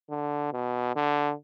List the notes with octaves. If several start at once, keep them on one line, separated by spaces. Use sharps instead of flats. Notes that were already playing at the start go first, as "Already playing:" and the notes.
D3
B2
D3